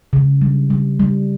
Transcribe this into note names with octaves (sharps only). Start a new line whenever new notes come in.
C#3
G3
G3
G3